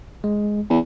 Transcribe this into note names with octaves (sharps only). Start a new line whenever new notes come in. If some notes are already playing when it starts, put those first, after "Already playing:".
G#3
E2